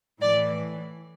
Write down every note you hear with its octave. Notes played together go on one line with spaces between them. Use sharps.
A2 E3 D5